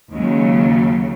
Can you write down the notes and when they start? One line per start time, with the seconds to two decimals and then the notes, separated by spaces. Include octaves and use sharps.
0.13 D#2 C#3 F#3 G#3